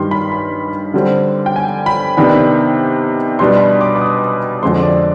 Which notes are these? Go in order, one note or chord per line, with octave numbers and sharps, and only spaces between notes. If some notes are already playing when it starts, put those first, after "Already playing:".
Already playing: G2 D#3 G3 C6
B5
B5
D3 G3 C4
G5
G#5
B5
C3 D#3 B3 D4
B2 G3 D4 C6
B5
C6
D6
D6
D#6
F2 D3 F3 G#3 C4 C6
D5